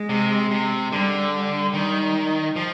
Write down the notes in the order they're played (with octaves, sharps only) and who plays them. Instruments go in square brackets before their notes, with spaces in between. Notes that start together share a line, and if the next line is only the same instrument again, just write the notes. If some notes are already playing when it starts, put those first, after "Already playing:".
Already playing: [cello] G#3
[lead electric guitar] C3
C3
[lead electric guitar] D3 [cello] G3
[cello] G3
[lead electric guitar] D#3
F3